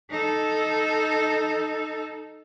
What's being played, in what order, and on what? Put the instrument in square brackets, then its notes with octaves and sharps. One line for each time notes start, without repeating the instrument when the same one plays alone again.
[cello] D#4 A4